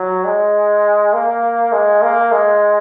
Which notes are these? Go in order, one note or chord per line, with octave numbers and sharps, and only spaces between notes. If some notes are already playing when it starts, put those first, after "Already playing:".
Already playing: F#3
G#3
A#3
G#3
A#3
G#3